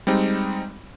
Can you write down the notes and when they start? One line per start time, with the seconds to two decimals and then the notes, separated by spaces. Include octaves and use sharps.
0.07 G3 G#3 C4 D#4